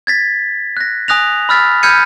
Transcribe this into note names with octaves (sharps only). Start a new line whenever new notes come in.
G#6 A6 B6
F#6 A#6
G#5 D#6 F#6 A#6 F7
B5 E6 F6 A6 B6
B5 F6 G6 G#6 C#7 D#7